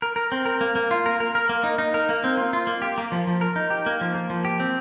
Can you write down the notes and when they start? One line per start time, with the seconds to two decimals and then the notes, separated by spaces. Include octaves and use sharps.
0.02 A#4
0.16 A#4
0.32 C4
0.45 A#4
0.61 A#3
0.75 A#3
0.91 F4
1.06 A#4
1.20 A#4
1.35 A#4
1.49 A#3
1.64 D#4
1.78 D#4
1.94 A#4
2.09 A#3
2.24 C4
2.37 F4
2.53 F4
2.67 A#3
2.82 G4
2.98 A#3
3.12 F3
3.27 F3
3.41 A#4
3.56 D#4
3.70 G4
3.86 A#3
4.01 F3
4.15 A#3
4.30 F3
4.45 G4
4.60 C4